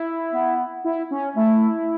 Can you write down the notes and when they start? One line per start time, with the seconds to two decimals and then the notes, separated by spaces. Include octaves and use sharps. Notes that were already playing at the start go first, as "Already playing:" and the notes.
Already playing: E4
0.33 B3
0.84 E4
1.11 C#4
1.36 A3 E4